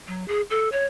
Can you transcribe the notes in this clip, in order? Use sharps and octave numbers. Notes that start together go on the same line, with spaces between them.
F#3
G#4
A4
C#5